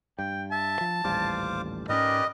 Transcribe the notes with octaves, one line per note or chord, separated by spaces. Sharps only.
G2 G5
E5 A5
F3
D#1 A1 G3 C5 F5 D6
G#2 B3 C#4 G4 A#4 B4 D5 D#5